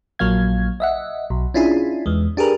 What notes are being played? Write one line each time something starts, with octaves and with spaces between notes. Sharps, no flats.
A#1 F#3 A#3 F5 G#6
D#5 E5 F#5
B1
C#4 D4 E4 F4 G#4
E2 G#3
D4 G4 G#4 A#4 B4